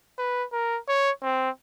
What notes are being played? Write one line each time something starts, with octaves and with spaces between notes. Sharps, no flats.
B4
A#4
C#5
C4